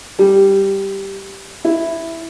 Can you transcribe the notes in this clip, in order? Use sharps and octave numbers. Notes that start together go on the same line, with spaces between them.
G3
E4